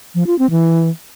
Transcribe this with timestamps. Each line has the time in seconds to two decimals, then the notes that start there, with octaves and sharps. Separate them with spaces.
0.15 F3
0.27 F4
0.39 C4
0.51 E3